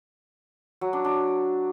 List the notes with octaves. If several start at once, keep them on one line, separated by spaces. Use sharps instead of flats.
F#3
D4
D4